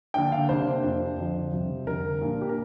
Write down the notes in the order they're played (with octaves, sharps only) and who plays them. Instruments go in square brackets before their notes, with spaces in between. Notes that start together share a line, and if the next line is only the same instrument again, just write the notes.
[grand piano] D3 A#3 D4 [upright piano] G5
[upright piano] F5
[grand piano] C3 A#3 D4 [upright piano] C5
[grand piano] F2 F3 D4
F2 D3 F3
F2 C3 G3 C4
[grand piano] F2 D3 G3 [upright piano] A#4
[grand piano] A#2 A#3 D4
[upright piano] G4
A#4